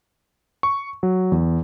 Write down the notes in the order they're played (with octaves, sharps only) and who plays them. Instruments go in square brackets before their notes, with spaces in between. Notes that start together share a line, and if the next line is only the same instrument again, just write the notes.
[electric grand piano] C#6
F#3
E2